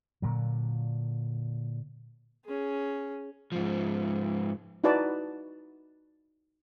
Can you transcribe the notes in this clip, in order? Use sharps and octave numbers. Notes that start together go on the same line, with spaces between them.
A#2 D3 F#3
C#4 G#4
G#2 F3
D#4 E4 F#4 B4 D5 A5